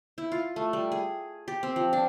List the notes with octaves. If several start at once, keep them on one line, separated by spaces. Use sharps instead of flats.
E4
F4
A3
G3
G#4
G4
C4
F3
D4